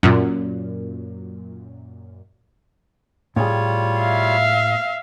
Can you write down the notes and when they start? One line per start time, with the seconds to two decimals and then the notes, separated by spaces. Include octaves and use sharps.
0.03 F#2 A#2
3.36 A2 G3 F4 G#4 C#5
4.01 E5 F5